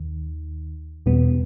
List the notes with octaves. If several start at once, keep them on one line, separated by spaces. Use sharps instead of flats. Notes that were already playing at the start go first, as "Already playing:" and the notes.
Already playing: D#2 D#3
E2 B2 G3 B3